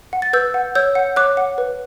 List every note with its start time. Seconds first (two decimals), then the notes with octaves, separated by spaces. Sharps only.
0.13 F#5
0.22 A6
0.33 B4 E6 G6
0.54 F#5
0.75 C#5 E6 G6
0.95 F#5
1.16 C#5 D6 F#6
1.37 F#5
1.58 B4